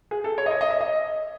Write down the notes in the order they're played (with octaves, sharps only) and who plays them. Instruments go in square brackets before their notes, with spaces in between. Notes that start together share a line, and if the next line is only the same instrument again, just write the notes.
[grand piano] G#4
A4
C#5
D#5
C#5
D#5
E5
D#5